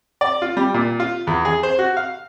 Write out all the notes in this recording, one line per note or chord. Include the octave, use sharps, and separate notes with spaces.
D5
F4
G3
A#2
F4
E2
G#4
C5
F#4
F5